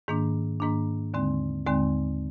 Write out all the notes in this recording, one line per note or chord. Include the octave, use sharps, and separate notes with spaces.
G#2 D#3 A#3 D4
G#2 D#3 A#3 D4
D#2 D3 G#3 C4
D#2 D3 G#3 C4